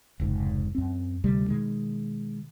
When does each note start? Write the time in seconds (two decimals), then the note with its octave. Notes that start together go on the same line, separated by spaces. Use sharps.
0.20 F1 C#2 G#2
0.75 F#2 C4
1.24 D2 C3 G3 A3
1.49 B2 D#3 G#3